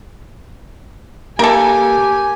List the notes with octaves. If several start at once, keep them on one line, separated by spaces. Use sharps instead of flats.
A#3 G4 A4 A#4 G#5